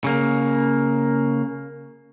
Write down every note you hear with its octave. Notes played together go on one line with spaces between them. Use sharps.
C#3 A#3